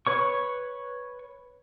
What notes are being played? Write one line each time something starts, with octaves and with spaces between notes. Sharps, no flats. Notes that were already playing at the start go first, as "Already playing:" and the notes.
B4 C#5 C#6